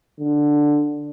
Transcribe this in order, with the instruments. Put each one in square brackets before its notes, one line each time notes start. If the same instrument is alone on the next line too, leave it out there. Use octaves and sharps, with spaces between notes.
[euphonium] D3